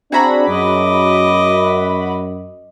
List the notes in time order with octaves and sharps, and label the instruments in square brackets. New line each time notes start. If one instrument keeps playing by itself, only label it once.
[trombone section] C4 D4 [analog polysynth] F#4 B5 [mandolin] G#4 E5 A#5
[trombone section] F#2 [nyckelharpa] D#5 D6